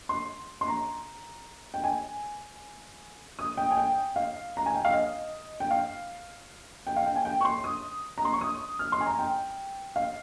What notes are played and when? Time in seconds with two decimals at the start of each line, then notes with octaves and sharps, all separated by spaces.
0.09 C6
0.61 C6
0.68 A#5
1.74 G5
1.84 G#5
3.39 D#6
3.57 G5
3.71 G#5
3.78 G5
4.16 F5
4.57 A#5
4.66 G#5
4.75 G5
4.85 F5
4.93 D#5
5.60 G5
5.71 F5
6.87 G5
6.96 F5
7.06 G5
7.16 G#5
7.25 G5
7.41 C#6
7.45 C6
7.64 D#6
8.18 A#5
8.25 C6
8.33 C#6
8.41 D#6
8.79 F6
8.92 C6
9.01 G#5
9.06 A#5
9.19 G5
9.96 F5